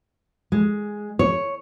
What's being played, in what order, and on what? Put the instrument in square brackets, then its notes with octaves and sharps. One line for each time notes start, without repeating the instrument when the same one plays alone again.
[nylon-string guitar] G#3
C#5